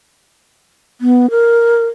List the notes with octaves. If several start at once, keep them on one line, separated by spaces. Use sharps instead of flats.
B3
A#4